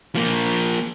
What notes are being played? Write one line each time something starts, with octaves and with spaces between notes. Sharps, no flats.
F3 A#3